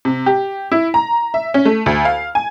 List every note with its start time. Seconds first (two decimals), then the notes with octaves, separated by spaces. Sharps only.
0.05 C3
0.26 G4
0.72 E4
0.94 A#5
1.34 E5
1.54 C#4
1.65 A3
1.86 D2
2.05 F5
2.35 G#5